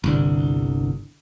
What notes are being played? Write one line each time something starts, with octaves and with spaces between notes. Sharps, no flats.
G1 C2 D3